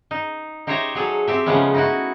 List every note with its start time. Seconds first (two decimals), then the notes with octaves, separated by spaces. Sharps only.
0.11 D#4
0.67 D#4 G4 C5 C#5 E5 A#5
0.95 F#3 G#4 A4
1.27 C4 G4 E5
1.46 C#3 F3 G#3 A3 B3 C#4
1.74 D#4 E4 F#4